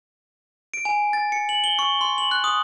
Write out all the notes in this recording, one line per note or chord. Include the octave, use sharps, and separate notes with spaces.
D7
G#5
A6
C#7
F#7
G7
C#6
C6
F#7
F#6
D#6